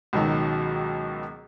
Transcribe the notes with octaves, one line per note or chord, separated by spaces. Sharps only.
C#2 B2 D#3 F#3